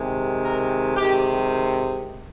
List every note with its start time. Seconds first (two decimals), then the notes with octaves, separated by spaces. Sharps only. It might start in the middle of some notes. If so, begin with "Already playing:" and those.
Already playing: C3 D#3 G#3
0.43 A#4
0.96 C3 D#3 G#3 G4